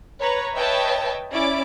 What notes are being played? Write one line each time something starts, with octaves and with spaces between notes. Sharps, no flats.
B4 C#5 A#5
B4 C#5 D#5 E5 G5 A5
C#4 E4 D5 D6